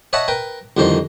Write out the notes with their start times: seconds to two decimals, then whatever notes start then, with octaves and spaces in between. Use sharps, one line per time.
0.13 C#5 D#5 E5 F#5 A5 B5
0.28 A#4 B4 G5
0.77 C2 F2 D3 D#3 C5